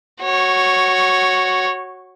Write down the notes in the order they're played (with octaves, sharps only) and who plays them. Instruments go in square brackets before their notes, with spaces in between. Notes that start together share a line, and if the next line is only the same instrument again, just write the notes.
[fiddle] F#4 C#5